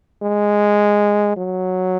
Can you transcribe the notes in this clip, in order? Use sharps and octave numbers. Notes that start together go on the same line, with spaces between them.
G#3
F#3